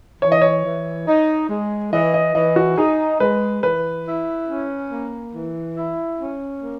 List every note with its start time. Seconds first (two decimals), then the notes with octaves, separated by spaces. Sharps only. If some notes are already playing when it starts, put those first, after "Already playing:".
0.22 E3 C#5
0.32 D#5
0.42 C#5
0.65 E3
1.08 D#4
1.49 G#3
1.92 E3 D#5
2.14 D#5
2.35 E3 D#5
2.56 F#4
2.77 D#4 G#4
3.20 G#3 B4
3.63 E3 B4
4.06 E4
4.48 C#4
4.91 A#3
5.34 E3
5.76 E4
6.19 C#4
6.61 A#3